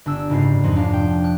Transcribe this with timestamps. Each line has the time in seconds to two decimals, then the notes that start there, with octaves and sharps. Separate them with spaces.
0.06 G1 D4 E6
0.29 F#1 G#2 G3 A#3 F4 C7
0.64 F2 F3 D#4
0.76 F1 D4 F5
0.93 G5
1.24 F#6